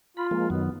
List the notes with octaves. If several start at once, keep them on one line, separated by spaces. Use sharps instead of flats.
F4 B5
F3 G#3 A#3
F#2 D#3 F#3 B3